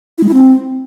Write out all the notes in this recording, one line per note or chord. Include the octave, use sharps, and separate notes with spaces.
E4
G#3
E4
C4